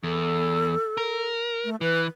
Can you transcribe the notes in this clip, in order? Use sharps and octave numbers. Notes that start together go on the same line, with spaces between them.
E2 A4
A#4
A3
E3 B4